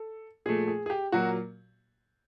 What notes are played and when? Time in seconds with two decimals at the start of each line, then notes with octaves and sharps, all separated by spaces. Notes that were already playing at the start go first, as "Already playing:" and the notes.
Already playing: A4
0.46 A#2 F3 A3 G#4
0.68 G#4
0.86 G#4
0.90 G4
1.12 A#2 F#3 A#3 F#4